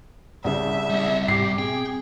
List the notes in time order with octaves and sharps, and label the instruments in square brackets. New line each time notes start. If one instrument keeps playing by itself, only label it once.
[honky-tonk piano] C2 C#3 [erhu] E5
[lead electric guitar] G3 C4
[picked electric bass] G#2 [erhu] G4 [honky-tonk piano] D6 C7
[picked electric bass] B2 C4 [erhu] G#4 [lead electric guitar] G5